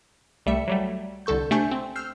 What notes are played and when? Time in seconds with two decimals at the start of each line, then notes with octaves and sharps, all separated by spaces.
0.46 C2 G3 A3 E5 C#7
0.68 F#3 G3 A3
1.26 C2 D3 A4 C#6 G6
1.51 C3 A3 D4 G#5 C#6 G6
1.71 C4
1.96 E6 F6 G6 C7